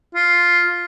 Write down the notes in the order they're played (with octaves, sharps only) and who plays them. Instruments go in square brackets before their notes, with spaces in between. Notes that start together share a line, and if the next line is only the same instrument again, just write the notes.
[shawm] F4